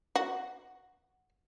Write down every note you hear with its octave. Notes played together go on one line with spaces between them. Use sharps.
F#4